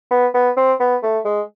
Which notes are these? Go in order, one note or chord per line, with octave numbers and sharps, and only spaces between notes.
B3
B3
C4
B3
A3
G#3